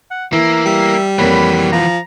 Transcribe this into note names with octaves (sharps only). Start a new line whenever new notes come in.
F#5
E3 A#3 E5
G3 E5
F2 E3 F#3 A#3 C#5 B5
F3 A#5